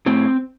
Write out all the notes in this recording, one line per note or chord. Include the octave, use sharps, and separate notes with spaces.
A2 C4